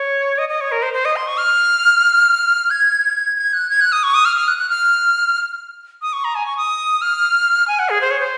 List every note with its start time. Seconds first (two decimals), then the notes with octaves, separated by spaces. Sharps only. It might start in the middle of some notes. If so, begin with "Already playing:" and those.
Already playing: C#5
0.38 D#5
0.49 D#5
0.61 C#5
0.72 A#4
0.82 C5
0.94 C5
1.05 D#5
1.16 C6
1.27 C#6
1.38 F6
2.71 G#6
3.37 G#6
3.54 F#6
3.70 G#6
3.81 F#6
3.92 D#6
4.03 C#6
4.14 D#6
4.25 F6
4.36 F6
4.48 F#6
4.59 F#6
4.70 F6
6.02 D#6
6.13 C#6
6.24 A#5
6.35 G#5
6.46 C#6
6.57 D#6
7.02 F6
7.68 G#5
7.79 F#5
7.89 G#4
8.01 C5
8.11 C#5
8.20 C5